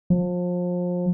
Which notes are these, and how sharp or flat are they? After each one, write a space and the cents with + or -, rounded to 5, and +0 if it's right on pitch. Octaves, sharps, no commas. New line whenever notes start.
F3 +30